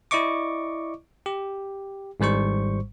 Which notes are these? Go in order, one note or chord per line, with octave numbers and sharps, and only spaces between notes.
E4 D5 D#5 C#6 D6
G4
G#1 G#2 G3 C5 C#6